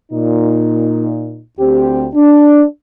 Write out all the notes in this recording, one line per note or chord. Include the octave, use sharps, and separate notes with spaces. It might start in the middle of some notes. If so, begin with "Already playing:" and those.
A#2 D#4
D2 C4 G4
D4